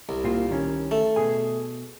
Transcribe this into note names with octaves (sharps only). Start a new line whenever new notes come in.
C2
A#2 C4 F4
D#3 C#4
A3
B2 G#4 G#5